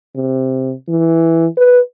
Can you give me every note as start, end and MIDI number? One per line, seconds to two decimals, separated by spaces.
0.16 0.74 48
0.89 1.46 52
1.58 1.80 71